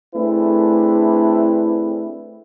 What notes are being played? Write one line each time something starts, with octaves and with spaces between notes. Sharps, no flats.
A3 C4 D4 E4 G#4 B4